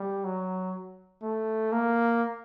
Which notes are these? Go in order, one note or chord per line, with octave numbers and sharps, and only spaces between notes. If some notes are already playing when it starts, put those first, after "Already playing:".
Already playing: G3
F#3
A3
A#3